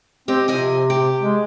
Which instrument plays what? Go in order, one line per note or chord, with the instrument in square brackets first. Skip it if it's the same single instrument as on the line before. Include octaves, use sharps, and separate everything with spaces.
[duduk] C4 [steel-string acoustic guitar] G4 D#5
[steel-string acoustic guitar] F2 D#5 G#5 [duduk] C3
[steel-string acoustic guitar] G4
[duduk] G#3